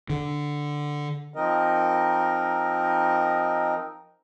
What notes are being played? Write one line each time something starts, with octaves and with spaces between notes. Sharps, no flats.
D3
F3 C4 D#4 A#4 D#5